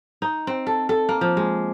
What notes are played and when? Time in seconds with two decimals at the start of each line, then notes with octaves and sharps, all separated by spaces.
0.22 D#4
0.47 C4
0.67 A4
0.89 A4
1.09 A#3
1.21 F3
1.37 G#3